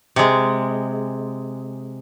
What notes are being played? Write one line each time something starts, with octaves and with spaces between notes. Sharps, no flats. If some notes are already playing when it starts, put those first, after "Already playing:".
C3 G#3